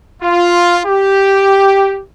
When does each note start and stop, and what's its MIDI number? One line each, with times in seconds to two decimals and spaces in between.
0.22 0.80 65
0.86 2.00 67